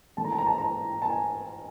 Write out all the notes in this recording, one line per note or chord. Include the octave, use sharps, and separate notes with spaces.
G#1 G#2 E3 A3 C#4 A5
A#5
A5
A#5
A5
A#5
A5
A5
G#5